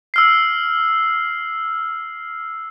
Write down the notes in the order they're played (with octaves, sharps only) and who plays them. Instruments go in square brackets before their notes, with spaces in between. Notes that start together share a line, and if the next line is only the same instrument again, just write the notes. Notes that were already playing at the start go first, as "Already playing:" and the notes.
[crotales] E6 F6 C7